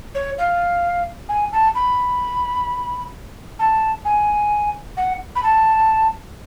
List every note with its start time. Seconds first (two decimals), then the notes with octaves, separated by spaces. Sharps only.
0.15 C#5
0.38 F5
1.29 G#5
1.52 A5
1.75 B5
3.59 A5
4.05 G#5
4.97 F#5
5.35 B5
5.43 A5